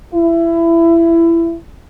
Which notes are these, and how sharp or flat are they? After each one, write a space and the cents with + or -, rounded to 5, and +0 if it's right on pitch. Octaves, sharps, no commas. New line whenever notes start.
E4 +20